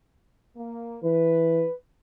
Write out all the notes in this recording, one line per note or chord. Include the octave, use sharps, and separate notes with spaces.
A#3
E3 B4